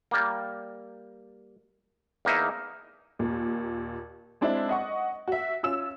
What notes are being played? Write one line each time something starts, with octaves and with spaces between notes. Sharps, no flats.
G3 A#3
E2 A#3 D#4 E4 E5
D#2 A#2
G#3 C4 D4 E4
D#5 F#5 C#6
F#4 E5
C#4 F4 E6 E7